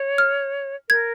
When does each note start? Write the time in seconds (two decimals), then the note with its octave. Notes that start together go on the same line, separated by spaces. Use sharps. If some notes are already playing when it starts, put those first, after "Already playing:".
Already playing: C#5
0.18 F6
0.90 A#4 G#6